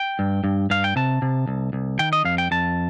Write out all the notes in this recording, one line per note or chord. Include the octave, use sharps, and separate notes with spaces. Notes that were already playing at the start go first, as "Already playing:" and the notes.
Already playing: G5
G2
G2
G2 F5
G5
C3 A5
C3
C2
C2
D#3 G5
D#5
F2 F5
G5
F2 A5